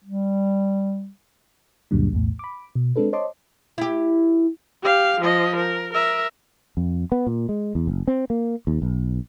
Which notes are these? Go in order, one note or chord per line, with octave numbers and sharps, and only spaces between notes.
G3
C#2 F#2 A#2 D3 F#3 G3
B1 E2 A2
B5 D6
B2
G#3 C4 D4 A4 B4
C5 C#5 D#5 A5 C6 D6
E4 G4
G4 F5
F3 D#5
A#4
A#4 E5
F2
B3
A#2
G#3
E2
F#1
C4
A#3
D#2
B1